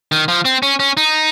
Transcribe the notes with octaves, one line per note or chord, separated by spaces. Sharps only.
D#3
F3
C4
C#4
C#4
D#4